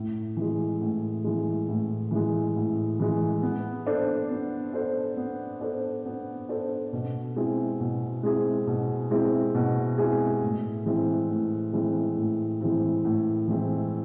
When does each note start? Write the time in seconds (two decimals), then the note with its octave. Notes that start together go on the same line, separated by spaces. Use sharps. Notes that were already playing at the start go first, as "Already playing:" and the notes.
Already playing: A2
0.37 E3 G#3
0.81 A2
1.24 E3 G#3
1.68 A2
2.11 E3 G#3
2.56 A2
3.00 E3 G#3
3.43 B3
3.86 D4 A4 C5
4.31 B3
4.74 D4 A4 C5
5.17 B3
5.61 D4 A4 C5
6.05 B3
6.49 D4 A4 C5
6.93 B2
7.36 G#3 C4 E4 G#4
7.80 B2
8.23 G#3 C4 E4 G#4
8.67 B2
9.11 G#3 C4 E4 G#4
9.55 B2
9.98 G#3 C4 E4 G#4
10.42 A2
10.86 E3 G#3 C4 E4
11.29 A2
11.73 E3 G#3 C4 E4
12.16 A2
12.60 E3 G#3 C4 E4
13.05 A2
13.48 E3 G#3 C4 E4